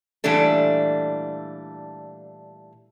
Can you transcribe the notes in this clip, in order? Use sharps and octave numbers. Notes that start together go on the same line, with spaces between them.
A#2 E3 G3 A3 D4 A4